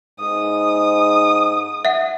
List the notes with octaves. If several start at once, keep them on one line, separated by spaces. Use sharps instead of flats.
G#2 D#6
E5 F#5